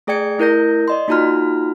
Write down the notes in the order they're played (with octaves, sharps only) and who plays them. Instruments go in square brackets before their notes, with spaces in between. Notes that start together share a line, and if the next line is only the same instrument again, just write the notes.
[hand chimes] A3 G#4 D5 G5 G#6 C#7
A3 E4 A#4 G6 A#6
D5 D#5 C6
A#3 D#4 F4 F#4 A#5 F6